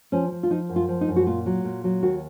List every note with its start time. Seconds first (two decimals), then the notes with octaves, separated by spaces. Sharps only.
0.12 F3 C#4
0.32 F3
0.43 F4
0.50 F3 D#4
0.69 F#2
0.76 F4
0.88 F3
1.01 D#4
1.08 F#2
1.16 F#4
1.27 A#2 F4
1.46 F#3
1.64 A#2
1.84 F#3
2.03 D#2 F#4